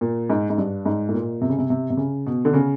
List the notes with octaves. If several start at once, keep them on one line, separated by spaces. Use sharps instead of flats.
A#2
G#2
G#2
G2
G#2
A2
A#2
C3
C#3
C3
C3
C3
C#3
B2
D3
C#3